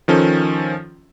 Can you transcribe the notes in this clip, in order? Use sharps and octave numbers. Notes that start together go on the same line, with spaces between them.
D#3 F3 C#4 A4